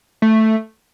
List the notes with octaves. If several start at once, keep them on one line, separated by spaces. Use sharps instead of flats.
A3